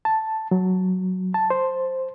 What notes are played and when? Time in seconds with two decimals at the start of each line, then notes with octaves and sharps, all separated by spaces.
0.05 A5
0.51 F#3
1.34 A5
1.50 C5